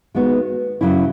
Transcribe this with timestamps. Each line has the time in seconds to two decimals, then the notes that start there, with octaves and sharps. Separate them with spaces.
0.15 D#3 G#3 B3 F#4
0.81 F#2 C#3 F#3 C#4 E4